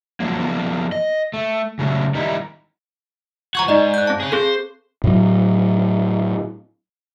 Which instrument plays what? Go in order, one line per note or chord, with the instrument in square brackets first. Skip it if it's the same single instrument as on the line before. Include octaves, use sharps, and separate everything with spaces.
[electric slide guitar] D3 F3 F#3 A#3
F3 A#3 B3
D#5
A3
C#3 F#3 A3
D#3 G3 D#4 E4
[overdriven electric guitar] F3 F#4 [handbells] A#5 C#6 G#6
[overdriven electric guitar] G#2 [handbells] D#4 D5 D#5
[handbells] F#6 G6
C4 A5
[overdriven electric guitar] G#4 C#5
[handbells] C4 G#4 A4 [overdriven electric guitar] C5
[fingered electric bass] A2 F#3